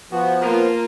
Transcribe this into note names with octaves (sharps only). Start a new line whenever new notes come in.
F3 B3 F#4
A#3 F4 A#4